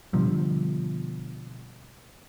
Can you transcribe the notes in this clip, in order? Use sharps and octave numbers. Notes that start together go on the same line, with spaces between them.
B2 D3 F3 G3